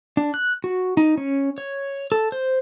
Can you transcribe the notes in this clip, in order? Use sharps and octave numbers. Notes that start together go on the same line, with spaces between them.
D4
F#6
F#4
D#4
C#4
C#5
A4
C5